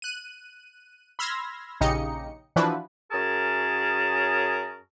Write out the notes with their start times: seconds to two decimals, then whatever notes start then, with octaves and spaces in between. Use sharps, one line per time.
0.02 F#6 D#7
1.19 B5 C6 E6 F6 G#6 A#6
1.81 A#1 C#3 D#4 G4 D#5 C#7
2.56 E3 F3 D4 E4 F#4 B4
3.11 F#2 C#4 G#4 A#4 A5